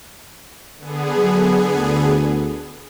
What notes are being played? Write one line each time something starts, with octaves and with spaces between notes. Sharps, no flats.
D3 B3 G#4
F#3
D2